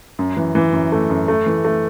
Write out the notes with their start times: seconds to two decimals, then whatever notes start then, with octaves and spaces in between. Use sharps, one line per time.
0.19 F#2
0.36 E3
0.55 E3
0.73 F#2
0.92 A3
1.10 F#2
1.28 A3
1.46 E3
1.64 A3